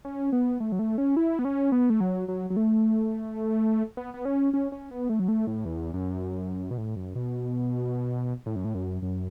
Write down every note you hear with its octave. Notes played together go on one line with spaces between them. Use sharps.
C#4
B3
A3
F#3
A3
C#4
E4
B3
C#4
B3
A3
F#3
F#3
F#3
A3
B3
B3
C#4
C#4
C#4
B3
A3
F#3
A3
A2
E2
F#2
B2
A2
F#2
B2
A2
F#2
A2
F#2
F#2